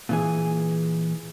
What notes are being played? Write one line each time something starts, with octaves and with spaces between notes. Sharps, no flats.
A#2 E3 G#4